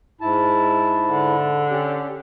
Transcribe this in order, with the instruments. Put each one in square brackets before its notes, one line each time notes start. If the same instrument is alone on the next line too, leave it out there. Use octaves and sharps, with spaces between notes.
[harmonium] G#2 E4 A5
[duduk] D3
[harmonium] C#4 G4